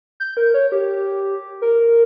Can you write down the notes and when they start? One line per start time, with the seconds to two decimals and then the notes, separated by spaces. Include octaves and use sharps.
0.20 G6
0.37 A#4
0.54 C#5
0.72 G4
1.62 A#4